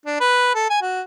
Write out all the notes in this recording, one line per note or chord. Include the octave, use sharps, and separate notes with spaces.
D4
B4
A4
G#5
F#4